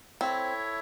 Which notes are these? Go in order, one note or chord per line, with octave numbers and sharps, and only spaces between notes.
C4 E4 A4 C#5 E5